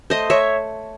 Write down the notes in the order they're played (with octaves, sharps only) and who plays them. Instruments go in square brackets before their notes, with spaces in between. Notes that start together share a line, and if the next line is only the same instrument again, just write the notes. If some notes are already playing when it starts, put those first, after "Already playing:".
[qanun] A3 C5 D#5
C#5 E5